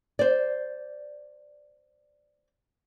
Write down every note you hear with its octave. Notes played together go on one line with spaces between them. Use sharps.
C5 D5